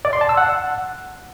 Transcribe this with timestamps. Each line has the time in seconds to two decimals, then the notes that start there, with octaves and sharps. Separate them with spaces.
0.05 D5
0.13 C6
0.21 A5
0.29 E6
0.37 F#5